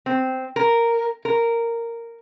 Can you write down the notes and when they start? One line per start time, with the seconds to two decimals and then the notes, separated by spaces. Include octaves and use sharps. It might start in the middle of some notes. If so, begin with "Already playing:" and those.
0.06 C4
0.56 A#4
1.25 A#4